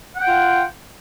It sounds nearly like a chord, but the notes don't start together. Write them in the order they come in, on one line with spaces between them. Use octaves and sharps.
F#5 G5 F4